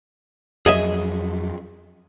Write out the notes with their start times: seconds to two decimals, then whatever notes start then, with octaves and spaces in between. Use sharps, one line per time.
0.66 F2 F#3 G#4 D#5 E5